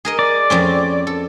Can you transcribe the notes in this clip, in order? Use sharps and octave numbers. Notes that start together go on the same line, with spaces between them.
G#4 A#4 D#5
D5
F2 C4 C#4
A4